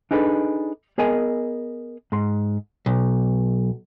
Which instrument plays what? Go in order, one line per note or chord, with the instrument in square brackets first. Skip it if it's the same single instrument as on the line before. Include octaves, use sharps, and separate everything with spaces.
[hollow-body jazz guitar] D4 D#4 G#4 A4 B4
B3 G#4 A#4 D#5 G#5
G#2 C6
B1